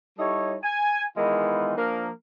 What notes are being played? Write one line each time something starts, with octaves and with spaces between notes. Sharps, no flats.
G3 D#4 E4 A4 C#5
G#5
D#3 E3 G#3 B3 D#4 F4
F3 A#3 D4 A#4